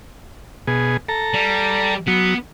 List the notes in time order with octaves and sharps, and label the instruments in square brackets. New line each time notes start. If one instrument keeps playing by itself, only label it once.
[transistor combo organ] B2 G#4
A4 A#5
[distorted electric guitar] G3
[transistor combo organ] F#3 [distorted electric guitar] B3